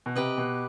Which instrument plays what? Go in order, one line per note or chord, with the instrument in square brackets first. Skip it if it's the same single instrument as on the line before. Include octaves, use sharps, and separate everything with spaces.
[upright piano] B2
[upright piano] C3 [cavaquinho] G4 B4 D#5
[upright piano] B2